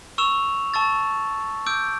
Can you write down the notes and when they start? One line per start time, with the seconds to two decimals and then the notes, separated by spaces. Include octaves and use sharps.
0.18 C#6 E6 E7 F7
0.74 A5 C#6 E6 A6
1.66 D6 E6 G6 D7